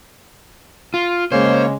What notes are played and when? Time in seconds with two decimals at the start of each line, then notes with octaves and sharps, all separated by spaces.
0.94 F4
1.32 C#3 G#3 A#3 C#4 C5 C#5